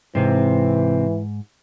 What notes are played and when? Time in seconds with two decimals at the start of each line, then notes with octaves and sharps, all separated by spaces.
0.15 G#2 C3 E3 C4